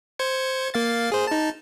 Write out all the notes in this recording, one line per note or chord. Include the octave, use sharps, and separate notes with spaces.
C5 G#6 C#7
A#3 F5 A6
G#4 C5
D#4 A5